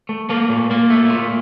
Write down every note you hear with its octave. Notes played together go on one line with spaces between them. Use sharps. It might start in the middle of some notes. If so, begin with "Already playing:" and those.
A3
A3 A#3
A#2
A#2 A#3
A3
A#2